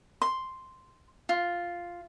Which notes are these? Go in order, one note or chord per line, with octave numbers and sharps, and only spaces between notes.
C6
F4